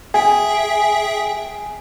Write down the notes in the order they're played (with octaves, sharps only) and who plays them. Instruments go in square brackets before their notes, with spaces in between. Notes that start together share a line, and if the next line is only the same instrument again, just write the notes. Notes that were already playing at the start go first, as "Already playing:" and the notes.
[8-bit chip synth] G#4 E5 G5 [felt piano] G#5